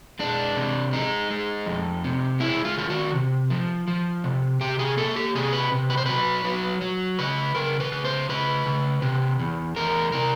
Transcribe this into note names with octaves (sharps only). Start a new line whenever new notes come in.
G#3 D4
C3
G#3 D#4
G#3
F2
C3
G#3 E4
F4
D#3 F4
F#4
C3
F3
F3
C3
C3 G4
G#4
A#3 A4
G4
C3 G#4
B4
C3
B4
C5
F#3 B4
F#3
F#3
C#3 B4
C#3 A#4
B4
C#3
C5
C#3 B4
C#3
C3
E2
E2 A#4
C3 A#4